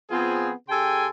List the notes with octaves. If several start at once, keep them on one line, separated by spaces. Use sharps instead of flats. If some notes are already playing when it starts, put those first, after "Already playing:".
F3 B3 C4 F4 G#4
C#3 G4 A4 G5 G#5 C6